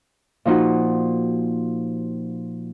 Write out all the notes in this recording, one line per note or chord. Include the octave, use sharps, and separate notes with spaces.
A#2 F3 D#4 F4 F#4